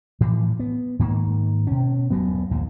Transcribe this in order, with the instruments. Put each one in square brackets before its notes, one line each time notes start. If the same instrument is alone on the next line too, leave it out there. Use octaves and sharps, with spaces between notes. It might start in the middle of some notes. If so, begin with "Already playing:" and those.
[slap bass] A2 E3 F3
B3
G#2 D#3 A#3
B2 C#4
D#1 G2 F#3 B3
A#1 D#2 G#2